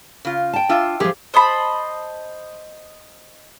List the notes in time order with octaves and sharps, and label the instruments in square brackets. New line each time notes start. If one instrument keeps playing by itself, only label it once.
[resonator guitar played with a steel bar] C#3 F4
[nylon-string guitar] G5 A5
[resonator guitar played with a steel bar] D4 F4 E5
[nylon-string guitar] D#3 F3 [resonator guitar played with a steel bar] G4 G#4
[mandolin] C5 D#5 A5 B5